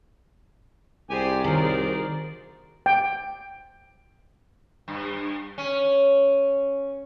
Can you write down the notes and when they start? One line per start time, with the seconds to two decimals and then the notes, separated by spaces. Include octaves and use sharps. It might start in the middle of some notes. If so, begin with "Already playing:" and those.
1.10 C2 G4 G#4 C5 D5 G#5
1.44 D#3 F#3 A#4
2.86 G5
4.88 G2
5.58 C#4